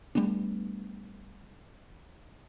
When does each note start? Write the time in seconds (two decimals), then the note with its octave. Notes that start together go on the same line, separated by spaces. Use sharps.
0.15 G3 A3 B3 D4